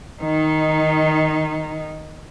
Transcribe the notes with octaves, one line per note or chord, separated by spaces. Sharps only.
D#3 D#4